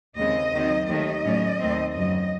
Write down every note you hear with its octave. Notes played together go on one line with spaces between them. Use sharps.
D#2 C#3 G#3 C4 D#5
D#2 D#3 F#3 C4
D#2 D#3 A3 D#5
A2 F#3 C#4
D#2 D#3 A3 C4
F#2 C#3 F#3 D#5